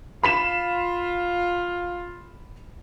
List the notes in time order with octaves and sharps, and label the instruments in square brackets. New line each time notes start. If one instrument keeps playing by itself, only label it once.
[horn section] F4 [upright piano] B5 B6 E7